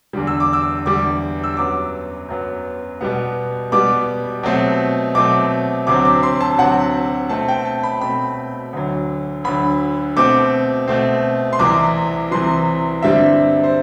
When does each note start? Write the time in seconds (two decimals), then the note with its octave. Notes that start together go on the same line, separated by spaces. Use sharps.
0.13 E2 D3 G3
0.27 E6
0.40 D6
0.53 E6
0.85 E2 D3 G3 D6
1.44 E6
1.57 F#2 F#3 B3 D6
2.29 F#2 F#3 B3
3.01 B2 G3 B3
3.72 B2 G3 B3 D6
4.43 B2 F#3 A3 C4
5.15 B2 F#3 A3 C4 D6
5.87 D2 C3 F#3 C4 D6
6.05 D6
6.23 C6
6.41 A5
6.58 D2 C3 F#3 C4 F#5
7.29 B2 A3 C4 A5
7.48 G5
7.65 A5
7.83 B5
8.01 B2 A3 C4 B5
8.73 D2 D3 F#3
9.44 D2 D3 F#3 B5
10.16 B2 A3 C4 D6
10.88 B2 A3 C4
11.53 C6
11.59 C2 C3 E3 D6
12.31 C2 C3 E3 C6
13.02 G2 D3 G3 C4 E5
13.64 C5